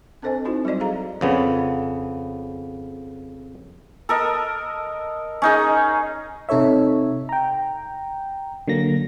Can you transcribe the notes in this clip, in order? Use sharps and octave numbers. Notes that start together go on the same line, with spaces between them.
C4 D4 A4 C5 D#5 G#5
C4 D#4 E4 F#4 C5
F#3 G3 F#4 D5 D#5
G#4 A4 F5 A#5
F2 C#3 B3
A4 A#4 D#5
C#4 D#4 G#4
C3 D#4 A4 C#5 E5
G5 A#5
D3 F#3 A#3 A#6